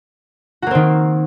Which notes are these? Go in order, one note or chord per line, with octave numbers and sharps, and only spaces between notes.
D#3 A#3 C4 F#4